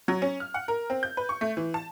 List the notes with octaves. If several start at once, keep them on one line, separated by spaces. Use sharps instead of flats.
F#3
C#4
F6
F#5
A#4
C4
G6
B4
C#6
A3
E3
A5